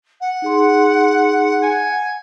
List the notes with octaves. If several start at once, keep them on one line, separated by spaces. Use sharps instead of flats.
F#5
D#4 G#4 C6
G#5